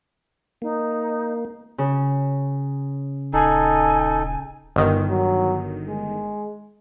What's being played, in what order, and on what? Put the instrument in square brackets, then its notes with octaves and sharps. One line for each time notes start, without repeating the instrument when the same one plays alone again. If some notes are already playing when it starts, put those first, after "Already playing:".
[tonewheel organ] A#3 [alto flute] D#4
[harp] C#3
[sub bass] D#1 [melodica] D#4 A4 [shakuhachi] G#5
[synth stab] G1 D#3
[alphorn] F#3
G#3